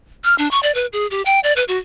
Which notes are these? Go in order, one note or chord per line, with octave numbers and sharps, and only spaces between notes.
F6
D4
C#6
D5
B4
G#4
G4
G5
D5
B4
F#4